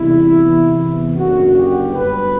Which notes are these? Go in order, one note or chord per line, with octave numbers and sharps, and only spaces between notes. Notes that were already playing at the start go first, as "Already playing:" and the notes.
Already playing: E2 C3 G3 E4
E2 C3 E3 B3
F#1 F#2 D3 F#4
G4
G1 G2 F#3 B4